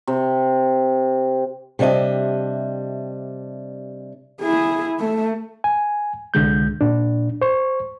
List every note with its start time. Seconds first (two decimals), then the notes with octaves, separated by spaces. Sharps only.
0.07 C3
1.79 C3 G3 D4 D#5 E5
4.42 E4 G#4
5.00 A3
5.64 G#5
6.34 C2 D3 G#3 G6
6.81 A#2 D4
7.41 C5 C#6